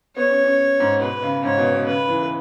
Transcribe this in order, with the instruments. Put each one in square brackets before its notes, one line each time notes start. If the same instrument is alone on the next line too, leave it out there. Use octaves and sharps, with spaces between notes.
[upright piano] B3 [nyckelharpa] C#5
[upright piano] C#4
C#4
G#2
[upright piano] B2 [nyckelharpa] B4
[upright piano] C#3
[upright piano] G#2 [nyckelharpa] C#5
[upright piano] B2
B2
[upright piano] C#3 [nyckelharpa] B4
[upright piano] E3